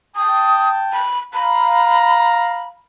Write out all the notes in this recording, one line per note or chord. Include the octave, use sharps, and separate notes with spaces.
G5 A5 D#6
B5
F5 A#5 B5